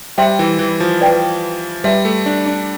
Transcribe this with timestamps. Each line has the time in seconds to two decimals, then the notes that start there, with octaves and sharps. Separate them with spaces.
0.18 G3 C5 E5 G5 C6
0.39 E3
0.59 E3
0.80 F3
1.01 B4 D5 G5
1.84 G3 B4 E5 A5 C6
2.05 A3
2.26 D4
2.46 D4